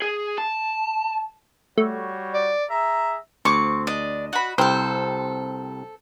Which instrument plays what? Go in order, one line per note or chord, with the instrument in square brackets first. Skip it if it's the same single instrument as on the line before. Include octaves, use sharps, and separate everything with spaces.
[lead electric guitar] G#4
A5
[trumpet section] G3 F#4 C#5 [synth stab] A3
[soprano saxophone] D5
[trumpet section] G#4 E5 [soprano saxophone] A#5
[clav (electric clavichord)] D2 [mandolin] C4 D6 [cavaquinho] C#6
[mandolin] D4 [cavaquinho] D#5
[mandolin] F#4 B5
[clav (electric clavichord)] C2 C4 G5 [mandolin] A4 C5